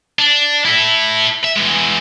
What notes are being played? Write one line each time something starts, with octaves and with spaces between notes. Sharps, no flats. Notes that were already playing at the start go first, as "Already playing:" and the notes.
D4
E4 A4
E5
E3 G#3